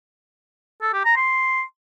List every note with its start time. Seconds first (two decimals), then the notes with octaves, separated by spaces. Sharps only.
0.82 A4
0.93 G4
1.05 A#5
1.17 C6